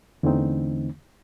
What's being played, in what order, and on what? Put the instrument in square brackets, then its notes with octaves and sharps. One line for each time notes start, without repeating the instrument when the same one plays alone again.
[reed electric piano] E2 D3 E3 A3 C4 D#4